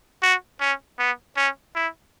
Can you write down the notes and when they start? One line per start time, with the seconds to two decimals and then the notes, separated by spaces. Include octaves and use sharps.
0.23 F#4
0.60 C#4
0.99 B3
1.36 C#4
1.75 E4